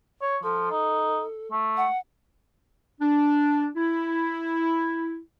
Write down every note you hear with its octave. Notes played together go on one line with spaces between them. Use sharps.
C#5
F3 A4
D#4
A3
F#5
D4
E4